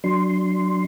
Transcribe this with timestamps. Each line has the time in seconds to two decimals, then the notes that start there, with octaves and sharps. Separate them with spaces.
0.04 F#3 D4 C6